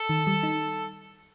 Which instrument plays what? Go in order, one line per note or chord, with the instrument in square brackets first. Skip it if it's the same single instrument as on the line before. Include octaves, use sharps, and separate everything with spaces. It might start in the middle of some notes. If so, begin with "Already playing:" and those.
Already playing: [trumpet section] A4
[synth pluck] D#3
G3
D#4